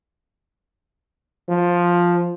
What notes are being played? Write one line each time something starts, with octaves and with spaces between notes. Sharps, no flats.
F3